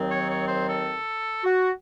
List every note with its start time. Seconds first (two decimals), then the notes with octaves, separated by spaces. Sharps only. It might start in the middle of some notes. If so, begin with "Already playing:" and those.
Already playing: D#2 D#3 F#3 C4
0.10 C#5
0.28 C#5
0.47 C5
0.67 A4
1.44 F#4